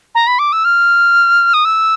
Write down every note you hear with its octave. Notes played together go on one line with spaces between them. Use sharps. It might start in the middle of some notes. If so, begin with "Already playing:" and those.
A#5
B5
D6
E6
F6
D#6
E6